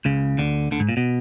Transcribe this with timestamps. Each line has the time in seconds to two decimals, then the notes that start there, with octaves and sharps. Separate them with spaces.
0.05 C#2 C#3
0.38 D2 D3
0.71 D2 D3
0.80 G#2
0.89 A#2
0.97 B2